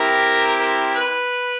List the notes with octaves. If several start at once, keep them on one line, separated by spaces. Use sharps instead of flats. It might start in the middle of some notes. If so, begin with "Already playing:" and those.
Already playing: C4 E4 G4 A#4
A#4
B4